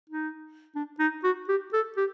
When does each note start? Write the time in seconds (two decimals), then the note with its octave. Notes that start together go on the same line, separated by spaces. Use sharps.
0.10 D#4
0.75 D4
0.99 D#4
1.24 F#4
1.48 G4
1.73 A4
1.97 G4